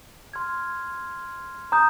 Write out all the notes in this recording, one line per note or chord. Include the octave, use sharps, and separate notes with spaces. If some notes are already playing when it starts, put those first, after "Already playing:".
C6 F6 G#6
A#5 D#6 G6